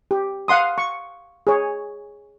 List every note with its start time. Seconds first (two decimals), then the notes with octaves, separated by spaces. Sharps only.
0.11 G4
0.48 F5 F#5 C6 D#6
0.78 C#6
1.47 G#4 C#5